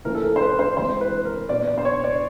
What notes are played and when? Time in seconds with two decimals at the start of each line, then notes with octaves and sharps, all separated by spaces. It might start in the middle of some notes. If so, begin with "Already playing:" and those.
0.05 A2 F3 A#3 C#4 A#4
0.15 A4
0.23 A#4
0.36 C5
0.42 B4
0.59 C5
0.77 E3 G#3 C4 C5
1.01 B4
1.25 A#4
1.49 A#2 F#3 B3 D5
1.67 D5
1.78 C5
1.85 C#5
2.04 D5